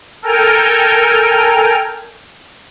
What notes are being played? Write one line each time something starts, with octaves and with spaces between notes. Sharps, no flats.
A4 A#4 G5 G#5 F6